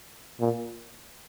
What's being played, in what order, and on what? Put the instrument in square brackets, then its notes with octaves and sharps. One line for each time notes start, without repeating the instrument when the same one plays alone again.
[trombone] A#2